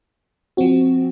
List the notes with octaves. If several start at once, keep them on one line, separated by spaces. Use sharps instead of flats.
F3 C4 F#4